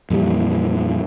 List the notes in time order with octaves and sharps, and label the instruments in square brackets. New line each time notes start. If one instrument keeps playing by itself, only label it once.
[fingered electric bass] F2 A#2 E3 G3